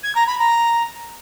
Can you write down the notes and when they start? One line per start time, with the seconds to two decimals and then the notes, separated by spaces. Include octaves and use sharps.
0.03 G#6
0.15 A#5
0.27 B5
0.38 A#5